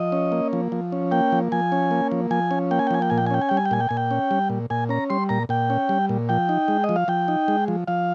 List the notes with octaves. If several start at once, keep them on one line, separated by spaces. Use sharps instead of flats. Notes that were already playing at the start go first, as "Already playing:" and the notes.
Already playing: F3 D#5
C#4
A#3
F3
F3
C#4
A#3 G5
F3
F3 G#5
C#4
A#3
F3
F3 G#5
C#4
A#3 G5
G#5
G5
F3 G#5
G5
A#2 G#5
G5
G#5
C#4 G5
G#5
G3 G5
G#5
G5
A#2 G#5
G5
A#2 G#5
G5
C#4
G3
A#2
A#2 G#5
C#4 A#5
G3 C6
A#2 A#5
A#2 G5
C#4
G3
A#2
F3 G5
D#4
G#3
D#5
F3
F5
F3 G5
D#4
G#3
F3
F3 F5